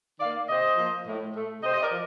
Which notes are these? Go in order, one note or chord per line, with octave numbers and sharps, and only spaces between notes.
D#3 A#3 D5 F5
C3 C5 D#5
F3 A#3
A2
A3
C3 C5 D#5
D#5
A#4 D5
F3